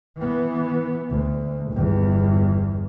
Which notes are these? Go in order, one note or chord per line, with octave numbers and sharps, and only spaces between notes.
E3 B3
D2
G1 E2